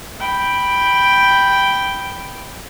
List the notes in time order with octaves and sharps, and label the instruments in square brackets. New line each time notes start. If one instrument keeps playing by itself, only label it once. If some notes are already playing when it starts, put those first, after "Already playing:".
[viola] G5 B5